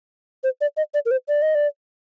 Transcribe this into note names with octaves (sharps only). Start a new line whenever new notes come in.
C5
D5
D#5
D5
A#4
C5
D5
D#5
D5